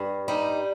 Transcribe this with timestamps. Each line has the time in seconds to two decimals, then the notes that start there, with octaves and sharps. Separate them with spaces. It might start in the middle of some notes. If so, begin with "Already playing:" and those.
Already playing: G2
0.28 G3 D#4